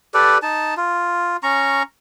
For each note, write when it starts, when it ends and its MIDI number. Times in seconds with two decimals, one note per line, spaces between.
0.14 0.38 67
0.14 0.38 69
0.14 0.38 71
0.14 0.38 74
0.42 0.74 63
0.42 0.74 81
0.77 1.37 65
1.43 1.83 61
1.43 1.83 82
1.43 1.83 85